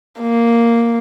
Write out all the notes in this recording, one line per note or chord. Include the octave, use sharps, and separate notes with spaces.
A#3